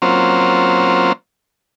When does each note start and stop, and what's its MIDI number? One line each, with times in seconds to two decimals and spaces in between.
0.02 1.13 54
0.02 1.13 58
0.02 1.13 60
0.02 1.13 61
0.02 1.13 65
0.02 1.13 72